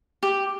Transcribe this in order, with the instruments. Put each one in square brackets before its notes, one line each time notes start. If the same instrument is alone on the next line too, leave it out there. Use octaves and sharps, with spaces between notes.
[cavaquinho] G4